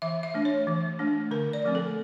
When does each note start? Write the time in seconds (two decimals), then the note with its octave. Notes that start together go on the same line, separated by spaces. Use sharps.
0.02 E3 E5
0.23 E5
0.34 A3 D4
0.45 C#5
0.67 E3
0.99 A3 D4
1.31 D3 A#4
1.53 D5
1.65 F3 A3 C4
1.75 A4